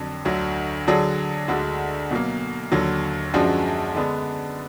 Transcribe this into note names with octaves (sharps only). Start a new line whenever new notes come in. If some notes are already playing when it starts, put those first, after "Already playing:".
Already playing: F2 D3 F#3 D4
D2 D3 F#3
D3 F#3 D4 G#4
D2 D3 G#3 D4 F#4
B2 F#3 A#3
D#2 D3 F#3
F#2 F3 G#3 D4 F#4
D3 G#3 B3 D4